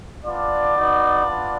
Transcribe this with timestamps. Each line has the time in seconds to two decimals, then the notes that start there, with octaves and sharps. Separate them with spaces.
0.25 B3 D4 F4 D5
0.75 B3 D#4 F#4
1.24 B3 D4 F4